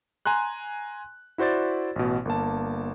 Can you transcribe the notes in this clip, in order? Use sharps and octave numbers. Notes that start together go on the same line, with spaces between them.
G#5 A#5 C6 F#6
E4 F#4 C5 D5 A6
A1 B2
G1 A#3 A5